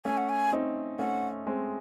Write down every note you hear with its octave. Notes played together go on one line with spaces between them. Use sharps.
A3 C#4 G#5
F#5
G#5
C4 D#4
A3 C#4 F#5
G#3 C4